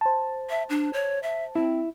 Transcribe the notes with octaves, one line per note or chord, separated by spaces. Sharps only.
C5 A5
E5
D4
C#5
E5
C4 E4